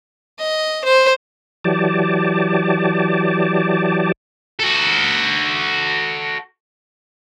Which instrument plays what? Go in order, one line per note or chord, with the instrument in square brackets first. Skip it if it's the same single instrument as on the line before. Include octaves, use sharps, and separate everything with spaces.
[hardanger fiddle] D#5
C5
[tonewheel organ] E3 F#3 G4 D5 A5
[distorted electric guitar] F#4 A4